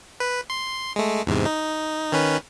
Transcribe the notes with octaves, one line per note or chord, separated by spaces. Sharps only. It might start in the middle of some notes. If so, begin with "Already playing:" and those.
B4
C6
G#3 A3
E2 G#2 C3
D#4
D#3 C#4 B4